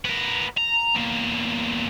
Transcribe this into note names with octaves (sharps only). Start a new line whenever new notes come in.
B3 A#4
A#5
E2 A#3